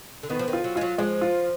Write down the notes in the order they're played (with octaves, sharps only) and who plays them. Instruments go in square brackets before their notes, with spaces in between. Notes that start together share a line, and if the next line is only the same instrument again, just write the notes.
[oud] D3
[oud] D#3 [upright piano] B3
[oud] F3
D#3
[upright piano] F4
[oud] F#3
[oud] G#3 [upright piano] F4
[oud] F#3
[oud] F3 [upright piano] G#3
[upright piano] F4